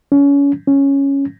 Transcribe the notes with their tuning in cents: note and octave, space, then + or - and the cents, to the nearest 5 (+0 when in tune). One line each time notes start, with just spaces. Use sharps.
C#4 +30
C#4 +0